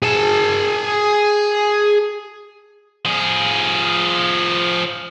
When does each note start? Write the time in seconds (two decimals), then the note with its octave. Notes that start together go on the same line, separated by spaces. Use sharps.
0.02 G#4 A5
3.05 F3 G#4